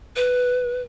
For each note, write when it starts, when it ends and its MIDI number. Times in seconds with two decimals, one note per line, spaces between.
0.16 0.82 71